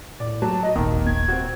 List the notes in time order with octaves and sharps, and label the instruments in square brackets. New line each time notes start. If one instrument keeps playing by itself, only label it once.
[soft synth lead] A2 [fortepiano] D5
[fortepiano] F#3 [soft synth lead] A5
[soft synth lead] D#5
[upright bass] D#1 G#1 [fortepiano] D#3 [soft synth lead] A#3
[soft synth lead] G#6
[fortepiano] C4 F#4